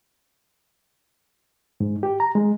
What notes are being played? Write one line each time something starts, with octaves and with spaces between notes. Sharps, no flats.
G#2
G4
A#5
G#3